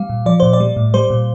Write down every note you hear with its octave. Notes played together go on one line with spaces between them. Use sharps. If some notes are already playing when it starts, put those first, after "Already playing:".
Already playing: G3 F5
A#2
F3 D5
A#2 C5
D5
G3
A2
G3 C5
A#2